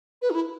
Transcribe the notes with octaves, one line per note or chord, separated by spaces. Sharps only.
B4
D#4
E4